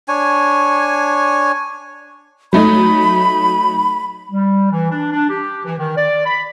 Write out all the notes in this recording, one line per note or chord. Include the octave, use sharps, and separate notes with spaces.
D4 C#5 G#5
F#3 A3 D#4 B5
G3
E3
D4
D4
G4
E3
D#3
D5
B5